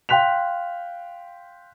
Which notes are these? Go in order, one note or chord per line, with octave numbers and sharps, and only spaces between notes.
F5 G5 C6 F#6 B6 F7